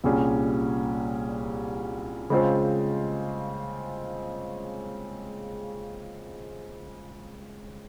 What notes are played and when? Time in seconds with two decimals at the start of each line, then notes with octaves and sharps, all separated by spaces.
0.04 C2 A#2 G3 C#4 G#4
2.30 C#3 G#3 C4 F4 C5